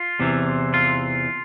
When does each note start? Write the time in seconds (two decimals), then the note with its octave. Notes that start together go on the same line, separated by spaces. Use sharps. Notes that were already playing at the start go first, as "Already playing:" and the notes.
Already playing: F4
0.20 E2 C3 E3
0.74 F4